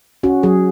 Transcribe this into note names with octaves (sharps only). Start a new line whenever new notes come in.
C#4 F#4
F#3 G#4